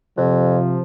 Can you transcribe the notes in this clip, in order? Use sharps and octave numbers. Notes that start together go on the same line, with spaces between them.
F2 C3 F3